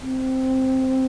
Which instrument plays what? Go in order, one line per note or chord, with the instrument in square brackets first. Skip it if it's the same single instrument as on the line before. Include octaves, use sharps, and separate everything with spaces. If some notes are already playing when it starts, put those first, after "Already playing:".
[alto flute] C4